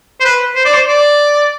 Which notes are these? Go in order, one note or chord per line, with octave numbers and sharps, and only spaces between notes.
C5
B4
C5
D5
C5
D5